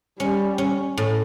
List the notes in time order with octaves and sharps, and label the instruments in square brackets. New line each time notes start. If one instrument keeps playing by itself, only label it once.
[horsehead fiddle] G3 [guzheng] C#4
[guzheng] C#4
A2